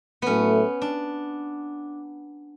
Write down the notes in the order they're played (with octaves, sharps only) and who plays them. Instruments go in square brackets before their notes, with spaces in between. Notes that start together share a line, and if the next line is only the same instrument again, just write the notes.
[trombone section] A2 F#3 A3 [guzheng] B3 C#4
[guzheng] D4